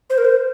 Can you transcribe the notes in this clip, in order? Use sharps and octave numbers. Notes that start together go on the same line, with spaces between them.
C5
A#4
C5